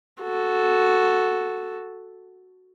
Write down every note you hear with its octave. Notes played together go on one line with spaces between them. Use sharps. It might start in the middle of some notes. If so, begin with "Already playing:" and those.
F#4 A4